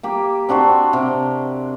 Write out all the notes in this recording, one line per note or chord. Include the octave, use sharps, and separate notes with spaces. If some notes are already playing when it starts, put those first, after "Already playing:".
A#3 G4
C4 D4 F#4 C5
C3